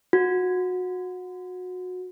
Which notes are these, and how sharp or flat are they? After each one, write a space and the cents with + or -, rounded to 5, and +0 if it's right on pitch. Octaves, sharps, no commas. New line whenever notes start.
F#4 -25